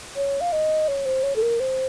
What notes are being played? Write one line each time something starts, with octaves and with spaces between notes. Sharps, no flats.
C#5
F5
D#5
C#5
C5
C#5
A4
A#4
C5